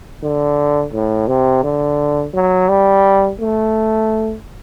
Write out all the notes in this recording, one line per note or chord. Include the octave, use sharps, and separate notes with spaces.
D3
A2
C3
D3
F#3
G3
A3